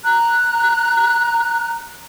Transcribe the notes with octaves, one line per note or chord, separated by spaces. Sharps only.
A#5 F#6